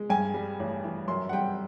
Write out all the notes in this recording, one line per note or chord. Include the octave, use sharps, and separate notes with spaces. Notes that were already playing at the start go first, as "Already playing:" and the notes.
Already playing: G#3
G2 G#5
G3
A1
E3
F#2 C6
F#5
G3 G5